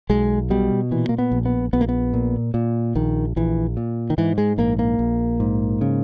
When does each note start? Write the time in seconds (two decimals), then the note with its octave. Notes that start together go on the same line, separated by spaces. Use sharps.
0.09 B1 G#3
0.50 B2 G3
0.91 A#2 E3
1.09 A#3
1.18 B3
1.31 A#1
1.45 B3
1.73 A#1 B3
1.81 A#3
1.89 B3
2.13 A#2
2.54 A#2
2.95 A#1 D#3
3.36 A#1 E3
3.77 A#2
4.10 D#3
4.18 G#2 E3
4.38 G#3
4.58 A#1 A#3
4.79 A#3
4.99 A#1
5.40 G#2
5.81 C#3